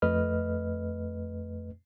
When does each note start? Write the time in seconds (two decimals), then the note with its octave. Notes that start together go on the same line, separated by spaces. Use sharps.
0.02 F2 A3 B4 D#5 F6